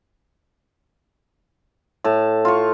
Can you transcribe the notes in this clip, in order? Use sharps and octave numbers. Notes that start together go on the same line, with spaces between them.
A2 A5
F4 C#6